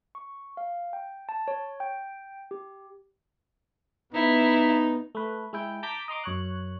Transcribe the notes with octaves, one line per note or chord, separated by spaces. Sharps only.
C#6
F5
G5
A5
C#5
G5
G4
B3 D#4 E4
A3 B4
G#3 E4 G5
A5 A#5 D6 G6 B6
D#5 A#5 C6 D6
F#2 C#5 F#6